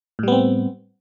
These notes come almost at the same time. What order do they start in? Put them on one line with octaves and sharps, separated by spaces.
A2 G3 B3 C4